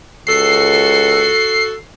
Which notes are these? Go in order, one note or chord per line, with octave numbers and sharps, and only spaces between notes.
C#2 F#4 A4 C7